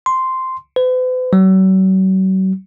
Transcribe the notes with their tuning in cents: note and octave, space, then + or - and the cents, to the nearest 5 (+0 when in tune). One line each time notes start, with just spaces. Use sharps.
C6 -5
B4 +45
F#3 +40